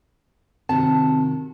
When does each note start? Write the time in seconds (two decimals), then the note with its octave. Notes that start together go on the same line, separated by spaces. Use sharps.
0.69 C3 D#3 C4 F#4 A5